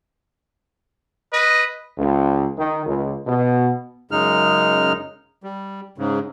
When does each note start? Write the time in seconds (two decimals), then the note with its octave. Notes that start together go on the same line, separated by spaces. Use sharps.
1.33 B4 D#5
1.98 C#2
2.56 D#3
2.86 C#2
3.27 B2
4.11 F#2 C#3 G#3 D#4 F6
5.43 G3
5.98 G#2 C#3